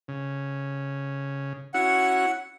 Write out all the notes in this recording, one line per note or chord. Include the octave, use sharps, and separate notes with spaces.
C#3
C#4 E4 F#4 F#5